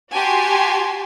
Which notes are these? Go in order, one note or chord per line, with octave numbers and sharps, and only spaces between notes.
F#4 G4 G#5 A5 C6